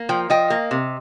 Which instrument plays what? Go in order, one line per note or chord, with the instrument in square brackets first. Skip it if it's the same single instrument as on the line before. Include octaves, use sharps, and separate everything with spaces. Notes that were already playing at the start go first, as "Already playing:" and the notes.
Already playing: [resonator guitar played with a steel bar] A#3
F3 G5
F3 D#5 G5
A#3
C3